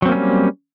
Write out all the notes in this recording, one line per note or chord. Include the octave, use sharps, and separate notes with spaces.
F#3 G3 A#3 C4 C#4